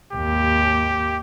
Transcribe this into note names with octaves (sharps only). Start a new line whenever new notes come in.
G#1 D#2 G4